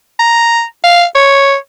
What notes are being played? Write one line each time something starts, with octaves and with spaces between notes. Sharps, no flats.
A#5
F5
C#5